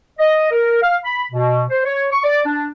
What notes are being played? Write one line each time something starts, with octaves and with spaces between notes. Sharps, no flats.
D#5
A#4
F5
B5
B2
C5
C#5
C#6
D5
D4